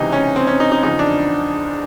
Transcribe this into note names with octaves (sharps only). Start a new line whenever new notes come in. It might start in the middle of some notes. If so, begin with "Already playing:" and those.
Already playing: C#2 C3 E3 D#4
C#4
C4
C#4
D#4
D#4
E2 C#3 F3 D#4
D4